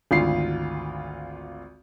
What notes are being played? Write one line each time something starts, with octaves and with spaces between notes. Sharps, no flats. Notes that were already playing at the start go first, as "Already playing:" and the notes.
G#1 D2 F4 C7